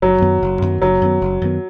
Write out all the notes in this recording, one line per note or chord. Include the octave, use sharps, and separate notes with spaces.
F#1 F#3
F#2 D#3 B3
F#1
F#2 D#3 B3
F#1 F#3
F#2 D#3 B3
F#1
F#2 D#3 B3